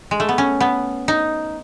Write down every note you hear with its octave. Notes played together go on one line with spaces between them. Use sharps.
G#3
A3
B3
C#4
B3
D#4